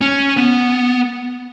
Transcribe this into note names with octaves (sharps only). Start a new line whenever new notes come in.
C#4
B3